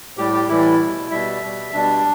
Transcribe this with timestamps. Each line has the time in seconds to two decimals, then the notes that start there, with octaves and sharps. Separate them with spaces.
0.17 A2 G3 G4
0.33 G4
0.49 A2 E3 G3 E4
0.80 B2 G3
1.11 B2 G3 E5
1.42 B2 G3
1.73 B2 G3 D4